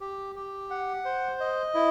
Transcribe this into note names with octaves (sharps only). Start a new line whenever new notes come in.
G4
G4
F#5
C5
D#5
E4